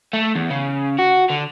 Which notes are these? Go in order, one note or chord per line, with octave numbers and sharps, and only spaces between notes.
A3
E2
C#3
F#4
D3